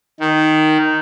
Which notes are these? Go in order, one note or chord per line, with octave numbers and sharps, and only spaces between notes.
D#3